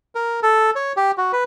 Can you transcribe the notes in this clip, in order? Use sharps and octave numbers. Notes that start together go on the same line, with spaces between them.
A#4
A4
C#5
G4
F#4
B4